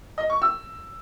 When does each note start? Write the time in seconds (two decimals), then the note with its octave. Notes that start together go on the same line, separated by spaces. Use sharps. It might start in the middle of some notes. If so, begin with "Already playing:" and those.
0.18 D#5
0.30 C#6
0.42 E6